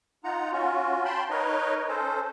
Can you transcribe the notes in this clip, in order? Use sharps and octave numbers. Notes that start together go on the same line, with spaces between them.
D#4 F4 F#5 A#5
C#4 F4 F#4
G5 A5 B5 C6
D#4 A#4 B4 C#5 D#5
C#4 A4 C5